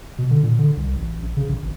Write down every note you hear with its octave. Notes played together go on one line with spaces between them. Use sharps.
B2
D3
A#2
D3
C2
A1
A#1
C#3
A#1
G#1